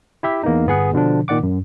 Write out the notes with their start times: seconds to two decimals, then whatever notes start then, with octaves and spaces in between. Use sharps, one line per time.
0.23 E4 G4 E5
0.43 E2 A#3 B3 D#4
0.67 G1 B3 G#4 F#5
0.93 B2 D3 F3 D4
1.28 A#2 D#3 D5 F#5 D6
1.43 F#2